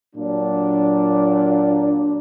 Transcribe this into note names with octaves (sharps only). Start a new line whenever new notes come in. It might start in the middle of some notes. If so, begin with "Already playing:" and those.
A#2 F#3 D4